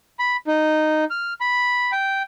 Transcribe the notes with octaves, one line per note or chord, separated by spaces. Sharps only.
B5
D#4
F6
B5
G5